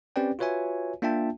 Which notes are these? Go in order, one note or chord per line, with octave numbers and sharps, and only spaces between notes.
C4 C#4 G4 B4 D5 G5
F4 F#4 B4 C#5 E5 G#5
A#3 D4 F4 E5 G5 A5